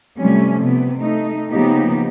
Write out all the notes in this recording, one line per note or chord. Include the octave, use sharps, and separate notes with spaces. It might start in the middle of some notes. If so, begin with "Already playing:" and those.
C3 F3 G3 A3 C#4
C3 B3
A3 D#4
C#3 F3 A#3 B3 D#4 G4